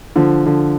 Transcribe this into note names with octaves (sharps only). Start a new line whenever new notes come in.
D3 F3
D3 F3